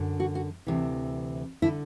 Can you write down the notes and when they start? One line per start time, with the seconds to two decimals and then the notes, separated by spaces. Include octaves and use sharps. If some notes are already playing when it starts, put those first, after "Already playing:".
Already playing: F#2 D3
0.20 F#4
0.35 F#4
0.67 D2 C3 E3
1.62 D3 E4